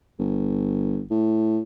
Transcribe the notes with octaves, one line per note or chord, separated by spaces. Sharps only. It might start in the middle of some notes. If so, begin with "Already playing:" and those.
G1
A2